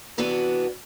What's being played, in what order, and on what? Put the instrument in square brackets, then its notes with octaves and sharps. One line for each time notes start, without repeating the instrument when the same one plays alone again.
[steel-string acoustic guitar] C3 E3 B3 D4 F#4